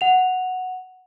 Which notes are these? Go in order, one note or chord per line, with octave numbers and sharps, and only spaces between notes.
F#5 F7